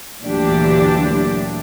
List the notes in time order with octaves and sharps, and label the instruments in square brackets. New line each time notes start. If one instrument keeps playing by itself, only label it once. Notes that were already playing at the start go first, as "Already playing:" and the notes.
[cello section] D2 A#2 E3 F#3 D4 G4